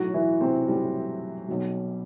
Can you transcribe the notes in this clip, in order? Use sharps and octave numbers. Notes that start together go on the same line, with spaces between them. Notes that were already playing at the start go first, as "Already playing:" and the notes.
Already playing: B1 A2 F#3 F#4
E3 E4
C3 C4
B1 A2 F#3 G3
B1 B2 F#3